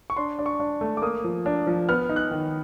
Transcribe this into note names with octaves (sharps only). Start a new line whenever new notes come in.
C#6
D4 C6
D4
C#6
D4
A3
D6
A#3 D#6
F3
D4
F3
B3 F6
D#4
F#6
D#3